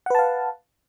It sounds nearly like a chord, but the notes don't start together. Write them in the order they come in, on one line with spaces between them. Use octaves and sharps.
F#5 B4 A5 F5